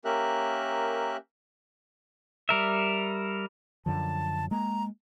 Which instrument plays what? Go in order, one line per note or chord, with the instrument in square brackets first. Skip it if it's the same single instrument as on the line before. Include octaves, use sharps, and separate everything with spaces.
[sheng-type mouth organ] A#3 C#4 G4 A#4 E5 F#6
[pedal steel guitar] G3 A#4 E5
[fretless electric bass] F#2 D3 F3 [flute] A5
[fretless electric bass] G#3 A#3 [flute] A#5